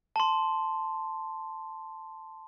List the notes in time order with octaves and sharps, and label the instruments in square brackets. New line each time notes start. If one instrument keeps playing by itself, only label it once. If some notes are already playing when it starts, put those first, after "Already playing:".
[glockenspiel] A5 C6